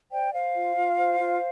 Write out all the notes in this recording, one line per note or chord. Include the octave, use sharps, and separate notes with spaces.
C5 D5 G5
C5 F5
F4
F4
C5
F4